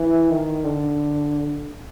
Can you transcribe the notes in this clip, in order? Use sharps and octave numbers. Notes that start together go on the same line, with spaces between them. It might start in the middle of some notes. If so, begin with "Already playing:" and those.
Already playing: E3
D#3
D3